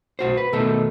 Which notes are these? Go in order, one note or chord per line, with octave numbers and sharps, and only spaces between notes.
B1 F#4 C5
B4
B2 D#3 A3 D#4 A4